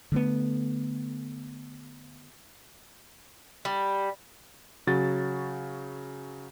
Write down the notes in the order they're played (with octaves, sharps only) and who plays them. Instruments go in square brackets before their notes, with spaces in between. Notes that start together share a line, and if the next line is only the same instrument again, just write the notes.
[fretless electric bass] D3 A3 B3
[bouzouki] G3
[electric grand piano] C#3 F#3 F#4 A6